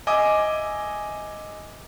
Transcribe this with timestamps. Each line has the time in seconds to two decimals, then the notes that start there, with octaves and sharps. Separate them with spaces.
0.07 D#5 E5 G#5 D6 D#6